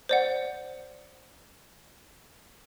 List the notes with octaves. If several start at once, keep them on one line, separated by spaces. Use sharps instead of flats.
C5 D5 F#5